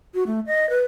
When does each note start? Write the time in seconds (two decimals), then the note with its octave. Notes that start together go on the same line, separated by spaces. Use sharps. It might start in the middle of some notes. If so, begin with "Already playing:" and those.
0.15 F#4
0.26 A3
0.46 D#5
0.70 B4